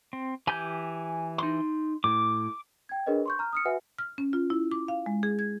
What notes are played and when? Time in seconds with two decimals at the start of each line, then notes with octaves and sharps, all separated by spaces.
0.13 C4
0.47 E3 G4 G#5 G6
1.38 D#4 C6
2.04 A2 D6
2.89 G5 G#6
3.06 D4 G#4 A#4 B4 C#5 D#5
3.26 C6 C#6 G6
3.39 A#5 F6
3.53 D#6 F6 C#7
3.65 F#4 B4 E5 F#5 G#5
3.99 F6
4.18 C#4
4.33 F4
4.50 E4
4.72 D6
4.88 F5
5.06 G#3
5.23 G#4
5.39 G#6